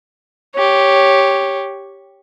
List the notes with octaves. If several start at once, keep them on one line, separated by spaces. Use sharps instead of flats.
G4 C#5